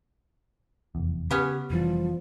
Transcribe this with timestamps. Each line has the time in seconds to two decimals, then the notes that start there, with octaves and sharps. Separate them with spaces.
0.95 F1 E2
1.31 C#3 B3 C#4 G4 C#5
1.70 F1 E3 F3 G3